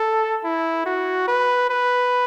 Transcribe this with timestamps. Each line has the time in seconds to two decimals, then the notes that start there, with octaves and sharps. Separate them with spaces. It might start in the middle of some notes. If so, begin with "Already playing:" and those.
Already playing: A4
0.44 E4
0.86 F#4
1.28 B4
1.70 B4